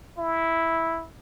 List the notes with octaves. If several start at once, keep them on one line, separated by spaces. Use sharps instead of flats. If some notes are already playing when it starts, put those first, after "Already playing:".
E4